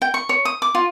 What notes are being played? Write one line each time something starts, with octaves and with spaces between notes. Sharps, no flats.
G5
C#6
C#5
D#6
D6
F4